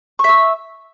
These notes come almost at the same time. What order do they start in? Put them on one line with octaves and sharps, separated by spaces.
C#6 E5 E6